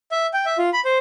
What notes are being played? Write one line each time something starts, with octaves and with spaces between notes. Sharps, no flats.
E5
G5
E5
F4
B5
C5